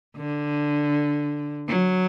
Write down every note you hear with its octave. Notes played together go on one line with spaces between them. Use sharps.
D3
F#3